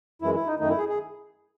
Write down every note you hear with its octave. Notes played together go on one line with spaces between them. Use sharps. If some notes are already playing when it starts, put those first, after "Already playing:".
F#2 E3 G#3 E4
E4
D#4
F#2 D#3 A3 D#4
E4
G#4
G#4